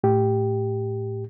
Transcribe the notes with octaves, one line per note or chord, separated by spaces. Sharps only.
A2 G4